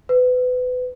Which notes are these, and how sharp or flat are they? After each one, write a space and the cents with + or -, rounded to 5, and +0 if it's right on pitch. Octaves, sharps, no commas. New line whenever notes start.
B4 +30